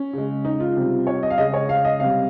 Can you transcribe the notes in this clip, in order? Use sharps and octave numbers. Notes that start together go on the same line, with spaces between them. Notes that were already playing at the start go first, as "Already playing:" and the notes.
Already playing: C#4
C#3 G#3
D#4
F4
C3 G3
C#5
D#5
F5
C#3 G#3 D#5
C#5
F5
D#5
C3 G3 F5